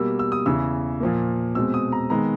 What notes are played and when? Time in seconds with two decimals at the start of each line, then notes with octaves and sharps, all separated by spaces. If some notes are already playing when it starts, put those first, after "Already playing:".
Already playing: B2 G3 A#3 E6
0.19 E6
0.32 D#6
0.46 E2 C#3 E3 E6
1.00 A#2 F3 A#3
1.55 B2 G#3 C4 E6
1.74 D#6
1.92 A#5
2.10 D#3 G#3 B3 A#5